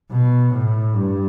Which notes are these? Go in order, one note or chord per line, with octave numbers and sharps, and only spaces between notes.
B2
A2
G2